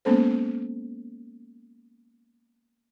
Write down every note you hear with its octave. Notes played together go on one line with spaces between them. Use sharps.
G#3 A#3 B3 C#4 A4 C5